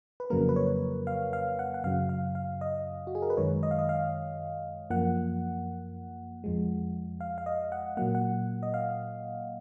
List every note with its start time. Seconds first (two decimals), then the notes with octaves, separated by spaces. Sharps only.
0.20 B4
0.30 F2 C#3 F#3 A#3 A#4
0.49 B4
0.56 C#5
1.07 F5
1.33 F5
1.59 F#5
1.74 F#5
1.84 F#2 C#3 F#3 F5
2.09 F5
2.35 F5
2.61 D#5
3.07 F#4
3.15 G#4
3.22 A#4
3.30 B4
3.37 F#2 D#3 G#3 C#5
3.63 D#5
3.71 F5
3.79 D#5
3.89 F5
4.90 F#2 F3 A#3 F#5
6.44 F2 F3 G#3
7.21 F5
7.38 F5
7.46 D#5
7.72 F#5
7.97 A#2 F#3 A#3 F#5
8.15 F#5
8.63 D#5
8.74 F5